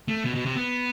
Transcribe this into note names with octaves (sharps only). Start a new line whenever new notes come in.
A3
B2
B2
C3
B3